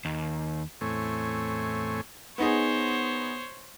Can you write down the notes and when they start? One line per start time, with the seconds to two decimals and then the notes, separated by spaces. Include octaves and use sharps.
0.05 D#2
0.81 E2 A2 A3 C4 C#5 G#5
2.38 B3 D#4 G#4 C5 C#5